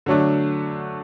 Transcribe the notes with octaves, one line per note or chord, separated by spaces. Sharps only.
D3 F#3 A3 D4